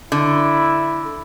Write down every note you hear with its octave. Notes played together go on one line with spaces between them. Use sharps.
D3 E4